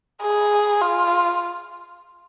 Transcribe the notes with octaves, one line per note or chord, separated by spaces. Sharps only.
G#4
F4